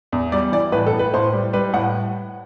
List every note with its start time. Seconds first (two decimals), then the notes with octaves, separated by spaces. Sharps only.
0.12 E2
0.32 G3 D5
0.52 E3 D5
0.72 A2 B4
0.87 A4
0.93 A2
0.99 B4
1.14 A2 C5
1.33 G3
1.53 G3 B4
1.74 A2 F#5